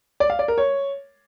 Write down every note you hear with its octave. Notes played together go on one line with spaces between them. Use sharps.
D5
F5
D5
A#4
C#5